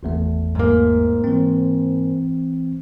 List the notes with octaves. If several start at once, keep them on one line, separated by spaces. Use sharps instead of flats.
G#1 E2 A3
G#2 A#3
E3 C4